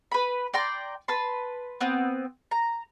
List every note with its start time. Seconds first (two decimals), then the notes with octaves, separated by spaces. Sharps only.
0.11 B4 B5
0.54 D5 G5 A#5 C6
1.08 B4 A5 C6
1.80 B3 C4
2.51 A#5